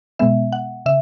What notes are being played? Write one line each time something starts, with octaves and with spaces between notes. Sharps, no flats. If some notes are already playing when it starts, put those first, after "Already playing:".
B2 G#3 B3 E5
F#5
C#3 E5